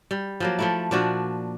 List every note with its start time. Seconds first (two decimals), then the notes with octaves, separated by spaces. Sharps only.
0.11 G3
0.40 F3 F#3 A#3
0.59 F3 A3 E4
0.91 A#2 F3 D4 F#4